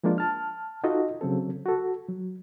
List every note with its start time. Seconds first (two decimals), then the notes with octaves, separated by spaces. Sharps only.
0.04 F3 G#3 A#3 D4 F4
0.18 A5 F6
0.84 D#4 F4 F#4 A4 D#5
1.21 C#3 F#3 C4 A4
1.65 F#4 A4
2.08 F#3